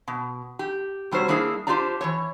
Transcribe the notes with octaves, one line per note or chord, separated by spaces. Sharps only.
B2
G4
C3 G3 F#4 C5 C#5
G3 A#3 D4 E4 G#4
D4 F4 G4 C5 D5 A#5
E3 G3 C#5